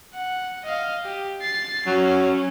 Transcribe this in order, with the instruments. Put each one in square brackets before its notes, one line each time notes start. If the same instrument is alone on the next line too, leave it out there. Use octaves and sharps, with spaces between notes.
[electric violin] F#5
D#5 F5
G4
A6 C7
[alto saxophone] F#3 [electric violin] C#4